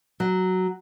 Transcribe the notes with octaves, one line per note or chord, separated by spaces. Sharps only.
F#3